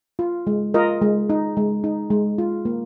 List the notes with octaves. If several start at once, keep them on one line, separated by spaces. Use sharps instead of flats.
F4
G#3
F4 A#4 D#5
G#3
D#4
G#3
D#4
G#3
F4
A#3